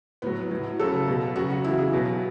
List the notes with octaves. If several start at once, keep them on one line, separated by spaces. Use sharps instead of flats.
A2 F#3 B3
A2 F#3
C#3 F#3 A4
B2 F#3
C#3 F#3 F#4
F#4
C#3 E3 E4
G#4
B2 F#3